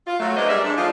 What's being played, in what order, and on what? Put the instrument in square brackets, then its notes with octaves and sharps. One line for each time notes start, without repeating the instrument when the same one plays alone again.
[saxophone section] F4
F#3 A3
G#3 A#3 B3 D4 C5 D#5
G3 G#4 A#4 D5 E5
G#2 G#3 D4
F3 A3 D4 D#4 F4